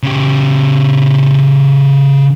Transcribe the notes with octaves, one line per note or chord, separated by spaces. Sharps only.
C#3 G4